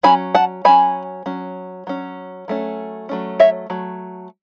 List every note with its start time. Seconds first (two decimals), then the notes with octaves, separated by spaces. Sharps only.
0.03 F#3 C#4 G#5 B5
0.35 F#5 A5
0.65 F#3 C#4 G#5 B5
1.26 F#3 C#4
1.87 F#3 C#4
2.48 F#3 A3 C#4
3.09 F#3 A3 C#4
3.40 C#5 E5
3.70 F#3 A3